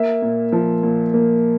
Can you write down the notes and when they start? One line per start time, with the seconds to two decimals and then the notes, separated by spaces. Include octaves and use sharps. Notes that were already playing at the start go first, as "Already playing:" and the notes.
Already playing: A#3 E5
0.22 A#2
0.52 F3
0.83 A#2
1.14 A#3